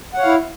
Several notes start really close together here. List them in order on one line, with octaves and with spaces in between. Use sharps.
F#5 C#5 F5 E4